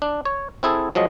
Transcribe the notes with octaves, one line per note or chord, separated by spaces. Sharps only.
D4
C#5
C4 E4 G#4 A4
F3 F#3 G#3 D#5